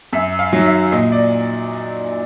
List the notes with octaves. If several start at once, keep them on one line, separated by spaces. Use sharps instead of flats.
F#2 E5
F5
D#3 F#3
E5
A#2 D#5
D5